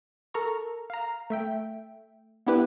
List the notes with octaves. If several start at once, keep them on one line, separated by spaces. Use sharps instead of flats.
A4 A#4 A#5 C#6
F5 A#5
A3 E5 G5
B3 D4 E4 G4 B4